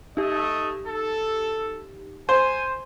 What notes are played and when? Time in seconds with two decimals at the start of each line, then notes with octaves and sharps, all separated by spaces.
0.17 A3 D#4 G4 D#5
0.85 A4
2.29 C5 G#5